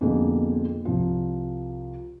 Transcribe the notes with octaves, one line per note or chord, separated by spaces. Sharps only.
F2 B2 D3 G#3 A#3
C2 F3